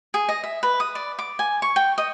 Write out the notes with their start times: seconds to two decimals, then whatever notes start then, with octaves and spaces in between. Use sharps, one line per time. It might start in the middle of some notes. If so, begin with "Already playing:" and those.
0.14 G#4
0.29 D#5
0.44 E5
0.63 B4
0.80 D#6
0.95 D5
1.19 D6
1.39 G#5
1.62 C#6
1.76 G5
1.98 D#5